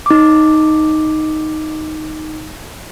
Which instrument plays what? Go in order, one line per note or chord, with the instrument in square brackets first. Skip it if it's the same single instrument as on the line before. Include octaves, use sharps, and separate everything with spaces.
[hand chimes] D#4 D6